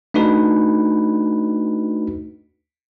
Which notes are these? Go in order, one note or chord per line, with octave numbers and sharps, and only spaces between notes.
A3 D4 D#4 F#4 B4